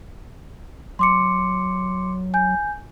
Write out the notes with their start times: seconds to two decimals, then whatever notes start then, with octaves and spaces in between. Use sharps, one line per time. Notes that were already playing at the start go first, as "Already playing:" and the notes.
0.99 F#3 C6 D6 C#7
2.34 G#5 G6